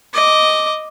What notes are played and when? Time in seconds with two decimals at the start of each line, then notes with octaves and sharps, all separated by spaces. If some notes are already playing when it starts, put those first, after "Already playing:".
0.13 D#5 D6